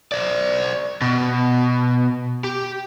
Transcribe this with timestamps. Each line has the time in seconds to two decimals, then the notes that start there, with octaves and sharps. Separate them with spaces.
0.12 C5 D5
1.02 B2
2.44 G4